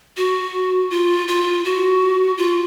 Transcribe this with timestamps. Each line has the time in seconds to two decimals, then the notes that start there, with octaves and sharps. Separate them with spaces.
0.17 F#4
0.90 F4
1.28 F4
1.65 F#4
2.38 F4